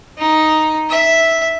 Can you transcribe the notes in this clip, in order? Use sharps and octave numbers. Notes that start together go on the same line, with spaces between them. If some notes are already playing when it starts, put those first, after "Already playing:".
D#4
E5